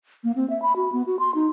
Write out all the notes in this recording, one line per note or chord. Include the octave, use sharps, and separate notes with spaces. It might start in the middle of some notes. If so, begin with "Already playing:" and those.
A#3
C4
E5
B5
F#4
B3
F#4
C6
D#4